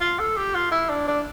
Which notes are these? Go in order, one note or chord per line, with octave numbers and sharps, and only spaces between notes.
F4
A4
G4
F4
E4
D4
D4